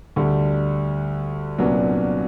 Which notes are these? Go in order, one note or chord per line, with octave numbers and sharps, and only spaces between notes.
D2 D3 G3
C2 A#2 F#3 B3 D4